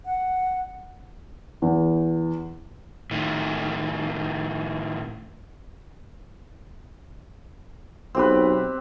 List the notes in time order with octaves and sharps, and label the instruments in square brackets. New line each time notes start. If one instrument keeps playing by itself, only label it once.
[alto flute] F#5
[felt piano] E2
[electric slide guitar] A2 D#3
[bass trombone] B1 [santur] C4 G4 B4